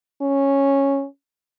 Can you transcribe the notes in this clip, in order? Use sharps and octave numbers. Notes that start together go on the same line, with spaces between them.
C#4